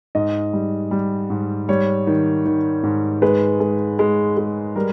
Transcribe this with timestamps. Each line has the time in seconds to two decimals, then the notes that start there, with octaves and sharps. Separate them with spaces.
0.15 G#2 D#5
0.53 G3
0.91 G3
1.30 G#2
1.68 G3 C#5
2.07 D#3
2.45 D#3
2.83 G#2
3.22 G#3 B4
3.60 G#3
3.99 G#3
4.37 G#3
4.76 G3 A#4